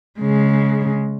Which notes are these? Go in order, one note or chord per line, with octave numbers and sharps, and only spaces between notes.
C#3 G#3